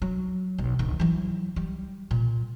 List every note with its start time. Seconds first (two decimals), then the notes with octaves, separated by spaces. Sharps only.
0.02 F#3
0.58 B1
0.79 D1 D#3
1.00 E3 F#3
1.56 G3
2.11 A#2